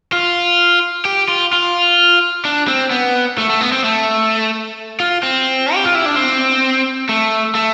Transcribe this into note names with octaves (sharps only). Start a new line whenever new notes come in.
F4
G4
F4
F4
D4
C4
B3
A3
A3
B3
C4
A3
F4
C4
G4
F4
E4
D4
C4
A3
A3